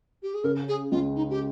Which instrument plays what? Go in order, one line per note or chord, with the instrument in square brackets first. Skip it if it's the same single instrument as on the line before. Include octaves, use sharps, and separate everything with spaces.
[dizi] G4
G#4
[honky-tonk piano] C#3 [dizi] A#4
[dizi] G#4
[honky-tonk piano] C#2 [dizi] F4
[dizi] D#4
G4